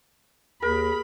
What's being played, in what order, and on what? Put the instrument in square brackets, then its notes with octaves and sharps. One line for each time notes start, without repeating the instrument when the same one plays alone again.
[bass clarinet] D#2 [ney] G#4 [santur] A#4 [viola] B5